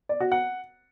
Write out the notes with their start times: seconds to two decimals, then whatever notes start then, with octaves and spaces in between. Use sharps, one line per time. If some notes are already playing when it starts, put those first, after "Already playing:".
0.09 D5
0.20 F#4
0.32 F#5